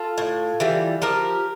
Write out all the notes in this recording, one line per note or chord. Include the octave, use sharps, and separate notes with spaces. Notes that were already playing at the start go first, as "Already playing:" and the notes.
Already playing: F4 A4
A2
E3 G3
F3 G4 A#4